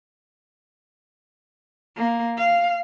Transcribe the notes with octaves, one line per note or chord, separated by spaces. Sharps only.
A#3
F5